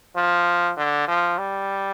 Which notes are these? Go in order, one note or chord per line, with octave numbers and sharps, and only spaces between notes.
F3
D3
F3
G3